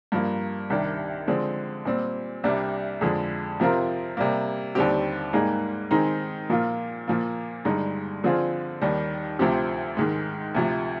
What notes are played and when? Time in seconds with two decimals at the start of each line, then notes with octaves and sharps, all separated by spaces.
0.12 G2 F3 A#3
0.70 C2 C3 D#3 G3 D4
1.28 D3 F3 G#3 C4
1.85 A#2 G3 C4
2.44 C2 C3 G3 D4
3.01 F2 D3 F3 G#3
3.60 C3 F3 C4 F4 A#4
4.17 C3 G3 A#3
4.75 D#2 D3 G3 C4 G4
5.33 G#2 G3 A#3 D#4 G#4
5.91 D#3 G#3 C4 D#4 G#4
6.50 A#2 F3 A#3 F4 A#4
7.08 A#2 F3 A#3
7.65 G2 D3 G#3 D#4
8.24 D3 F3 C4 F4 G#4
8.81 D#2 D#3 G3
9.39 D2 C3 F3 C4 G4
9.97 G#2 D#3 G#3
10.55 D2 C3 F3